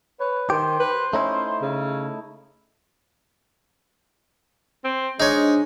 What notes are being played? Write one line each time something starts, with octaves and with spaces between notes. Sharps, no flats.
B4 C#5
D#3 G4 C5
B4
A3 C#4 D#4 E4
C#3
C4
G#3 D4 D#4 C5 C#5